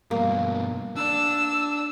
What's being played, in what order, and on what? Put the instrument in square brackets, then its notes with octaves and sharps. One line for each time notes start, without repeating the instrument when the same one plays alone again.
[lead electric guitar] G2 B2 [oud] A#3
[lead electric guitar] D4 D5 [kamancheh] E6